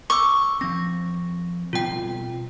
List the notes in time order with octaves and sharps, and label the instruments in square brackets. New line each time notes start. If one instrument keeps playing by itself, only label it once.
[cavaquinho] C#6 [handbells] D6 E6
[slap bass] F3 C4 [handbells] A#6
[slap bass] B2 G3 C4 [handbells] F4 G5